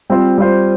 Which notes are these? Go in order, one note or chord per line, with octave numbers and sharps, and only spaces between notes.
G3 C4 F4 C5
G3 C4 F4 C5